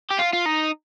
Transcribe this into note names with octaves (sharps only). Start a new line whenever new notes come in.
G4
F4
F4
D#4